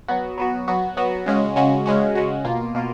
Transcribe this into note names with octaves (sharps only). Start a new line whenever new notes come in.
F#3 B3 F#4
F#3 B3 F#4
F#3 B3 F#4
F#3 B3 F#4
C#3 G#3 C#4 F#4
C#3 G#3 C#4 F#4
C#3 G#3 C#4 F#4
C#3 G#3 C#4 F#4
B2 A#3 F4
B2 A#3 F4